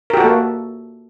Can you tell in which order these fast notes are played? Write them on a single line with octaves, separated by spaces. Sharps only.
A#4 G4 F#4 A4 A#3